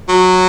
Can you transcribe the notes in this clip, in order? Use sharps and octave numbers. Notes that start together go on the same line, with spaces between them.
F#3